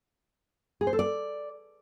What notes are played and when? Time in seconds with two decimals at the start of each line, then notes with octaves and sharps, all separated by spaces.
0.81 G#4
0.87 C5
0.93 A4
0.99 D5